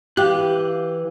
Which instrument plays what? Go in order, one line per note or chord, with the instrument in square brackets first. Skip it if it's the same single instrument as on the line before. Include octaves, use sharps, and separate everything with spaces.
[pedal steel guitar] E3 F5 F#6 [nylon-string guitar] G4